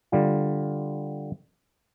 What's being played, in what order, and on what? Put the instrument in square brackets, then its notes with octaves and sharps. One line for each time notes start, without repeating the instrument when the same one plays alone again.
[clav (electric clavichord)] D3 G3 F4